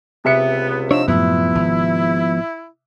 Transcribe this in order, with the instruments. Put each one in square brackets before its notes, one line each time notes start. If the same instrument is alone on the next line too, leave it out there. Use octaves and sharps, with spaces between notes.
[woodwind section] C#2 B3 [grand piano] C3 E5 C#7
[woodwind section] F3 D#4 E6 [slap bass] D4 [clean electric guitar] C#5
[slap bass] F#2 A2 [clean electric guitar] F3 B3 [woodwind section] E4
[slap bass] G#1